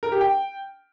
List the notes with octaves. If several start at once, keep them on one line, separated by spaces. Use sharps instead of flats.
A#4
G4
G5